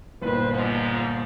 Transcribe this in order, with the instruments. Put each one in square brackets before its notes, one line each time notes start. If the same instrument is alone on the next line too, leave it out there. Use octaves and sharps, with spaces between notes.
[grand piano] G1 A#2 [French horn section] D#3 B4 C5
[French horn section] G#2 F3